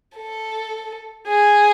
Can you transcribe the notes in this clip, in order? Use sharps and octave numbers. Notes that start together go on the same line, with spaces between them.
A4
G#4